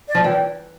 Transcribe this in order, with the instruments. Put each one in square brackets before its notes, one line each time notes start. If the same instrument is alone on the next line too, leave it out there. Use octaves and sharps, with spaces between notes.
[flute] D5
[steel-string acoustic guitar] F3
[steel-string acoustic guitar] E3 [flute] G5